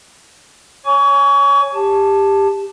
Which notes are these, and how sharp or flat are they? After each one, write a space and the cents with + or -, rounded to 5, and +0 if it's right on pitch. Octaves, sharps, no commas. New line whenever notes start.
C#5 +0 G#5 +0 C#6 +30
G4 +15 A5 +0